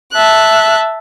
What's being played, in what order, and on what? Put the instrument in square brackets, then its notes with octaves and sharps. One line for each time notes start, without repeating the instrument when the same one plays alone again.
[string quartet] E5 A5 F#6